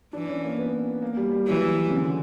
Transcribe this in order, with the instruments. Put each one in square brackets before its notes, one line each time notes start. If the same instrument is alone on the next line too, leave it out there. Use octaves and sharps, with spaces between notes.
[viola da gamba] E3 [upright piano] D4
[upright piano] C#4
A#3
B3
A#3
G3
G3
[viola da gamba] E3 [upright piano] F#3
[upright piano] C#3
D3